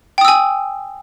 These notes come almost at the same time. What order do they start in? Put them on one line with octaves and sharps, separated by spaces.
G5 D#6 E6 G#5